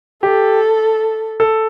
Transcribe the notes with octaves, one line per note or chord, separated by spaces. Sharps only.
G4 A4
A4